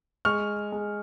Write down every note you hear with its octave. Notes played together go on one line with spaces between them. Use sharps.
G#3 C#6 F6
G#3